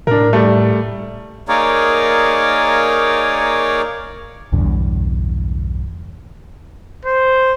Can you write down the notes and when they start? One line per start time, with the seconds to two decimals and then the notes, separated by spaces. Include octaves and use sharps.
0.07 A2 D4 A#4
0.33 G3 A3
1.49 A#3 D#4 G#4 A#4 C#5 D5
4.52 B1 E2 G2 D3
7.05 C5